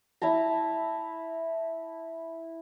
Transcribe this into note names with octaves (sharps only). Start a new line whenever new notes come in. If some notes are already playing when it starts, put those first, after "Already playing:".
E4 E5 A5 A#5